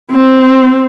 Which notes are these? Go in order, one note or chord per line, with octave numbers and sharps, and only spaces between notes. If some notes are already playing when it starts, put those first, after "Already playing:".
C4